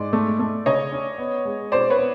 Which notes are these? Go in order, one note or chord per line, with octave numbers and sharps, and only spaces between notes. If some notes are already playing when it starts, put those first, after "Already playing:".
Already playing: G#2 D5
A3
A3
C#3 C#5 D#5
C#4
B3
G#3
B2 C5 D5
B4 C#5
B3